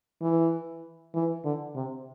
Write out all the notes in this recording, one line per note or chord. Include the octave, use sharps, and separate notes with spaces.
E3
E3
D3
C3